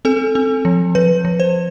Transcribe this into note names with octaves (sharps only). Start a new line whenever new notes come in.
C4 A4
C4
F3
F3 B4
F3
C5